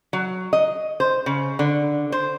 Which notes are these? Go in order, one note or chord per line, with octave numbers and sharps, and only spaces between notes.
F#3
D#5
C5
C#3
D3
C5